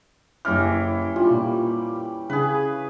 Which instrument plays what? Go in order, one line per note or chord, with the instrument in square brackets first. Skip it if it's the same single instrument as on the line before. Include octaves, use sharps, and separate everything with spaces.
[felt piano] F#1 F6 [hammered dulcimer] E3 C#4 G4
[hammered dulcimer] G3 [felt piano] F4
[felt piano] A#2
[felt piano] C#3 [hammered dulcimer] G#4 B4